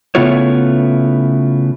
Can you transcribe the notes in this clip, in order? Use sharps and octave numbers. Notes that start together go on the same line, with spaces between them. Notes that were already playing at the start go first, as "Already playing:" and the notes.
C#3 A3 B3 E4 F4 C#5